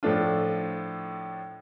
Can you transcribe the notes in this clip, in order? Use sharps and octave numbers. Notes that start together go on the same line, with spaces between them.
A2 F3 A3 D4 F4